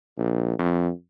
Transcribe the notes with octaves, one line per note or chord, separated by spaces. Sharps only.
A#1
F2